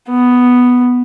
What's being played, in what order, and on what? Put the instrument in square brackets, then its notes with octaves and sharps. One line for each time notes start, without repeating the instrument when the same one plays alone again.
[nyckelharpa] B3